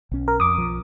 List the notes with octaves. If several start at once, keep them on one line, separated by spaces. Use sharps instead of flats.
B1 C#4
A#4
F2 D6 D#6
B1 F3